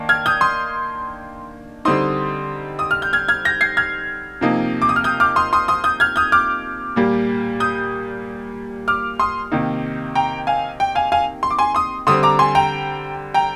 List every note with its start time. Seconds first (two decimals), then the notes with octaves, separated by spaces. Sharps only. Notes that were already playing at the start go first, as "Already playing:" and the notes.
Already playing: D#3 A#3 D4
0.09 F6 G#6
0.26 D#6 G6
0.41 C6 D#6
1.85 D3 G3 C4 D#4 C6 D#6
2.79 D#6
2.91 F6
3.02 G6
3.13 F6 G#6
3.28 F6 G#6
3.45 G6 A#6
3.61 G#6 C7
3.77 F6 G#6
4.41 C3 F3 A#3 D#4
4.82 D6
4.89 D#6
4.96 F6
5.04 D#6 G6
5.20 D6 F6
5.36 C6 D#6
5.53 C6 D#6
5.68 C6 D#6
5.84 D#6 G6
6.00 F6 G#6
6.16 D#6 G6
6.32 D6 F6
6.96 A#2 G3 A#3
7.60 D#6 G6
8.88 D6 F6
9.20 C6 D#6
9.52 C3 D#3 A#3 D#4
10.15 G5 A#5
10.47 F5 G#5
10.80 G5
10.95 F5 G#5
11.12 F5 G#5
11.43 C6
11.50 D6
11.59 G#5 C6
11.75 C6 D#6
12.07 D3 G3 C4 C6 D#6
12.23 A#5 D6
12.39 G#5 C6
12.55 G5 A#5
13.34 G5 A#5